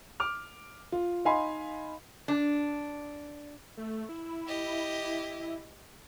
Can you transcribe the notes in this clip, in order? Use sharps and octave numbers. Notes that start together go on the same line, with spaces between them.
D6 F6
F4
D#4 D#5 F5 G#5 B5 C6
D4
A3
E4
G4 D#5